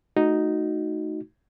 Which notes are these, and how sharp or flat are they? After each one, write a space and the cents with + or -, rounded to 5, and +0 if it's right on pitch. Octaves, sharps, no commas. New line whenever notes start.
A3 -20 D#4 +0 F#4 +0